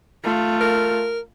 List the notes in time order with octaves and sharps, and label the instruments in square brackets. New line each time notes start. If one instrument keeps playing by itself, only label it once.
[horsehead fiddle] A3 F4
[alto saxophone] A#4